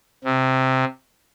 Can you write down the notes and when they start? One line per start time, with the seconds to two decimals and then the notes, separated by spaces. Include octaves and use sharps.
0.24 C3